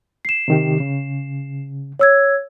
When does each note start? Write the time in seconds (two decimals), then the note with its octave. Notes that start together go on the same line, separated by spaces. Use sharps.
0.25 C7 E7
0.48 C3 D#3 G4
0.80 C#3
1.99 C#5 E6 G#6